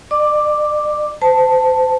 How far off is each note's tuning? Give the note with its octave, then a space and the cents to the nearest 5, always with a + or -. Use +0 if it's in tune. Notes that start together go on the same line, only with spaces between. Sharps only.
D5 +40 D6 +5
C5 -35 A5 +5